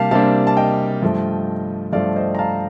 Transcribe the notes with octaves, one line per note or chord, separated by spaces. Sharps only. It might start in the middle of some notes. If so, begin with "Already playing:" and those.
Already playing: C3 G3 A#3 D4 F5 A5
C3 G3 A#3 D4 F5 A5
A5
D#5 G5
G2 F3 A3
G2 F3 A3 D5 F5
C5 D#5
A#5
F5 A5